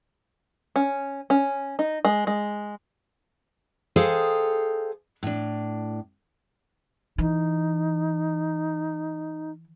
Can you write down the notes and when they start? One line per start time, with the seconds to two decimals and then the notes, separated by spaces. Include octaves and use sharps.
0.76 C#4
1.30 C#4
1.79 D#4
2.05 G#3
2.27 G#3
3.96 G#4 A4 C5 D#5 F5 G5
5.23 A2 D4
7.18 E3 D#4